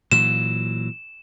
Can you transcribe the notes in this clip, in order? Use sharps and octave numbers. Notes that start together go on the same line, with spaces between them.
A#2 E3 F#3 E7